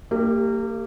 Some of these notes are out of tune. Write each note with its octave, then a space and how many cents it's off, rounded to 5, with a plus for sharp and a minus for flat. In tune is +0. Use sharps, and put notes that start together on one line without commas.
A#3 -35 G4 +15